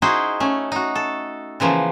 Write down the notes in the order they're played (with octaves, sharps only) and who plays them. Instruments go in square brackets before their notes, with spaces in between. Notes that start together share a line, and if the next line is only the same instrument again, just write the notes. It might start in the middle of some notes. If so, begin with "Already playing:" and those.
[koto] D#4 E4 F#4 G#4 C5
A3 C#4
D#4 F#4
A4
C#3 E3 F3 A#3 B3